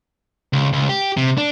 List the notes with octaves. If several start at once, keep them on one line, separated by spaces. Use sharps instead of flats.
C#2
C#2
G4
C3
D4